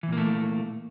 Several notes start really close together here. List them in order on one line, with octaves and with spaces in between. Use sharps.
E3 A#2 A#3 A3